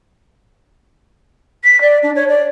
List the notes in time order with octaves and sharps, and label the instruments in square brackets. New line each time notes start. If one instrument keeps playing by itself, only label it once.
[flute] B6
D5
D4
C#5
D5